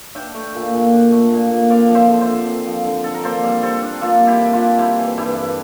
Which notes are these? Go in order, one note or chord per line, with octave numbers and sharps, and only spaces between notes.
D4 E5 G5
A3
A#2
A#2
D4
A3
A#2
A#2
C4 D5 F5
F3
C5 E5
D3
C5 E5
D3
C4
F3
D3
D3 A4
A#4
A#3 A4 C5
G3
C3 A4 C5
D4
A#3 F4 A4
G3
E4 G4
C3
F4
D4
G3 E4 G4
E3
G2 E4 G4
G2